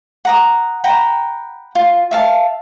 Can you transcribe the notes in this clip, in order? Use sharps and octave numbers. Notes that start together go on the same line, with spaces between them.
F#5 A#5 D#6
F#5 G5 A#5 B5
F4
E5 F5 A5